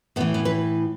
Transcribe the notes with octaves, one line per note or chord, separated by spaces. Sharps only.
A2 E3 B3
B3
B4